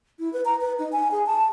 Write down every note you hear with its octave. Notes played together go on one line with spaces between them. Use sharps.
E4
B4
A#5
B4
D#4
G#5
G#4
A5